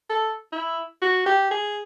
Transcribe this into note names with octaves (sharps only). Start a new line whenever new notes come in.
A4
E4
F#4
G4
G#4